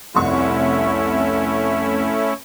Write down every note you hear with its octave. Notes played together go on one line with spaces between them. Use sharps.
F1 C2 A3 C#4 E4 C#6